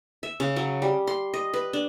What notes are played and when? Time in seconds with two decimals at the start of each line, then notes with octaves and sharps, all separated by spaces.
0.23 E5
0.40 C#3
0.56 F#3
0.82 G3
1.07 C6
1.34 D#5
1.54 B4
1.73 D4